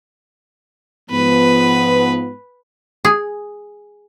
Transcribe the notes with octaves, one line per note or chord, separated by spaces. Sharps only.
G#2 F3 B3 B4
G#4